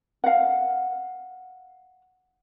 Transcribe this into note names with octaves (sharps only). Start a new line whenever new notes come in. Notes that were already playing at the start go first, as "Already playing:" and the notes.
F5 F#5